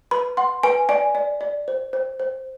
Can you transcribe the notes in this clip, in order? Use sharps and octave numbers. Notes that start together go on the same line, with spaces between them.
B4 B5
F#5 C6
B4 G#5
D5 G#5
D5
D5
C5
C5
C5